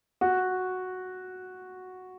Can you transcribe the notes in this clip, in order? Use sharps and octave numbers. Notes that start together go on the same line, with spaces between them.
F#4